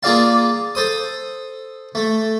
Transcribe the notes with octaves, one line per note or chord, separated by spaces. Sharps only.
A#3 F4 G#4 D5 F5 A5
A4 C5 D#6
A3